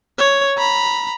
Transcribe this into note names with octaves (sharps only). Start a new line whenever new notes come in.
C#5
A#5 B5